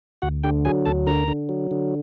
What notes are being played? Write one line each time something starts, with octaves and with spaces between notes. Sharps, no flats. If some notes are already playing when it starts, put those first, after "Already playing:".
D2 F#4 F#5
D3 G4 G5
F#3 G#4 G#5
D2 A4 A5
D3 A#4 A#5
D3
F#3
D3